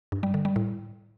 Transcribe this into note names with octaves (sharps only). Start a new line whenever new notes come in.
G2
G3
D3
G3
A2